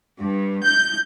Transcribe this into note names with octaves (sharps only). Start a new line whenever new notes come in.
G2
G6